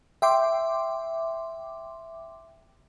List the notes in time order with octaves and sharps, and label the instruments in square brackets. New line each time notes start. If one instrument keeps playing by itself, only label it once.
[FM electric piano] E5 G5 C6 D6